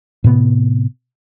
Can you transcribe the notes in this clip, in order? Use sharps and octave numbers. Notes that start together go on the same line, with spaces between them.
A2 C3 B3